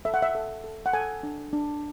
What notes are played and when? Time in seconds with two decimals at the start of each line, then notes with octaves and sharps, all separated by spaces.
0.05 A4 E5
0.14 F#5
0.22 E5
0.35 A4
0.64 A4
0.86 F#5
0.93 A4 G#5
1.23 D4
1.53 D4